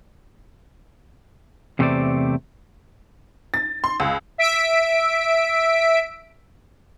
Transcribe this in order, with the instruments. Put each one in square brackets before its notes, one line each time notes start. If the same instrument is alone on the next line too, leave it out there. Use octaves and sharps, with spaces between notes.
[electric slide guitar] E2 C3 A3 B3 C5 D5
[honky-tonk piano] A6
C6
C#2
[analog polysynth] E5 E6 B6 D7